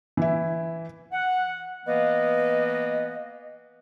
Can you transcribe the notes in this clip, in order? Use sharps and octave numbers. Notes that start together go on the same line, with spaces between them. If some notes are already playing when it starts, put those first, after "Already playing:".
E3 E4
F#5
E3 A#3 B3 B4 D#5